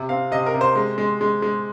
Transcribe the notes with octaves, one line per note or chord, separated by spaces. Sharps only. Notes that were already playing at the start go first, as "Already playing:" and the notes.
Already playing: C3
C4 F5
C3 D#5
A#4
C3
C5
G#3
G#3
G#3
G#3